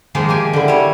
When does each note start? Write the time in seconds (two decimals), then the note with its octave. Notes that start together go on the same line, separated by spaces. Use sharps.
0.15 D#3 F3 G#3 A#3
0.29 A#3 G4 G#5
0.53 D3 E4
0.68 G3 C#5